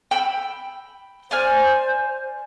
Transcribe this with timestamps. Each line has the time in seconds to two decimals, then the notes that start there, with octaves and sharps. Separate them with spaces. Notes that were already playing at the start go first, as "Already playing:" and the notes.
0.11 G5 B5 E6
1.31 C5 D5 G#5 F6